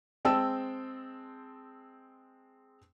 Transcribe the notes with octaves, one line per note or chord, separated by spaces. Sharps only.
G#3 C4 G5 A5 E6